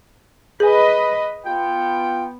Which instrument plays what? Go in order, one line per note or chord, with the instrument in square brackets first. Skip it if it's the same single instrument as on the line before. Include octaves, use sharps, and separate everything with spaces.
[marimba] G#4 G#5 [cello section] B4 D#5
[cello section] B3 [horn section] F4 G5